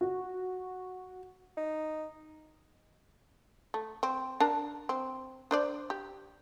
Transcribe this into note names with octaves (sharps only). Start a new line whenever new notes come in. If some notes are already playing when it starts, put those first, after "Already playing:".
F#4
D#4
A3
C4
D4 A#4 A5
C4
D4 C5 D5
G4